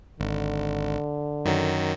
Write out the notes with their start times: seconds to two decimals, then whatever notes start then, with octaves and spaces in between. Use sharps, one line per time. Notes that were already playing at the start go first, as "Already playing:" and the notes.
0.20 G#1 D3
1.45 F#2 D#3 F#3